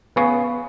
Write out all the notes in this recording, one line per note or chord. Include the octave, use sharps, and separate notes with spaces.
C#3 B3